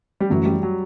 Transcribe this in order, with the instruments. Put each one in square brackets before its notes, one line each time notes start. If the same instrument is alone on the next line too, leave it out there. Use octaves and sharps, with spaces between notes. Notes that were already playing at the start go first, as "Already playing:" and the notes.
[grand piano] G3
[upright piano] F#2 E3 A3 [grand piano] F#3
[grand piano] G3
F#3